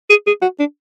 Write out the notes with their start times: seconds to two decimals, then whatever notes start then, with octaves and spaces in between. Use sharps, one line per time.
0.10 G#4
0.27 G#4
0.42 F#4
0.59 D4